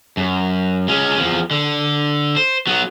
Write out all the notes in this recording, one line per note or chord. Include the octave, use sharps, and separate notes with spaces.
F#2
G#3 C#4
E2 F3
D3
C5
F#3 B3